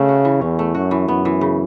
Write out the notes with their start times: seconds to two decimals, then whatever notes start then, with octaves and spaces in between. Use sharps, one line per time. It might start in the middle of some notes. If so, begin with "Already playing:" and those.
Already playing: C#3 A3 C#4
0.09 F#4
0.25 E3
0.41 E2 C#4
0.59 A3
0.75 F#2 F#4
0.91 E3
1.08 F#2 B3
1.25 E3
1.41 C#3